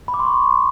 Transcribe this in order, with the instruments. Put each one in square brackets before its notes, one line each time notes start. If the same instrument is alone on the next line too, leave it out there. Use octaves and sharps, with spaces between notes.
[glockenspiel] B5
D6
C6
C#6